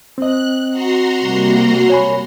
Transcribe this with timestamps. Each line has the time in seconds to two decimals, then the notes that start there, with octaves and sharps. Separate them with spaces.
0.18 C4 D#5 F#6
0.70 F#4 A#5 C6
1.20 C3 G3 A#3
1.90 C#5 G#5 B5